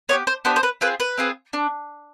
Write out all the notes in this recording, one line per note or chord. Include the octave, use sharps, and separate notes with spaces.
B3 D4 G4 C#5
C5
B3 D4 G4 C5
C5
B4
C4 F4 G#4 B4
B4
C4 F4 G#4
D4